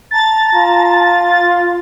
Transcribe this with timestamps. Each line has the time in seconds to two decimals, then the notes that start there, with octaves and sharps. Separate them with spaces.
0.11 A5 A#5 A6
0.55 F4